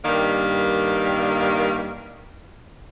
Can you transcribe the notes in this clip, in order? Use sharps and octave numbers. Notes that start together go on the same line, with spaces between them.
G2 D#3 G3 A#3